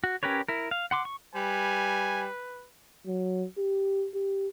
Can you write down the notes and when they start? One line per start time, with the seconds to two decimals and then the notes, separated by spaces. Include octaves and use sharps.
0.04 F#4
0.23 C#4 G4 A#4 B4 C#5
0.48 E4 A#4
0.71 F5
0.91 F#5 C6 D6
1.05 C#6
1.35 G3 B4 G#5
3.06 F#3
3.58 G4
4.14 G4